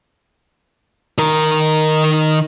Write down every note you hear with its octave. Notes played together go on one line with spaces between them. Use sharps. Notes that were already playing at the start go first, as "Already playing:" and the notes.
D#3 A#4